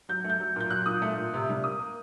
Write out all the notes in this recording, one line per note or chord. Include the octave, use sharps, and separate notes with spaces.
F#3 G6
A3
G6
F#3
A#2 G6
F#3 F#6
A#2 D#6
A3
A#2
C3
G3
A#3 D#6
A#3